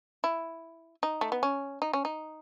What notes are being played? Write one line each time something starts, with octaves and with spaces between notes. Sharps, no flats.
E4
D#4
A3
B3
C#4
D#4
C#4
D#4